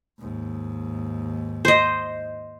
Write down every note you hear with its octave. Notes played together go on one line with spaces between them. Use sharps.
D#2 G#2
C5 D#5